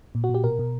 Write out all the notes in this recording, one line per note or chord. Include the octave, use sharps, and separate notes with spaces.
A#2
F#4
A#2
G4
B2 A#4
B2